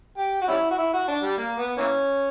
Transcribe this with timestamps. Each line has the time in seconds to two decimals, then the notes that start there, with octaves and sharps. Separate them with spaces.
0.18 G4
0.42 F#4
0.48 G3 C#4 E4
0.71 F#4
0.78 E4
0.93 F#4
1.08 D4
1.23 G3
1.38 A#3
1.58 B3
1.78 E3 A#3 C#4